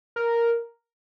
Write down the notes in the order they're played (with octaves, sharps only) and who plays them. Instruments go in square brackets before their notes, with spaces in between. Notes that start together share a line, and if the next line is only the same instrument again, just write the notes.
[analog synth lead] A#4